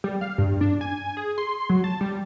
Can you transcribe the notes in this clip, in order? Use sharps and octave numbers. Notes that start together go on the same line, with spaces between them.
G3
F5
G2
D4
G#5
G#4
C6
F#3
A5
G3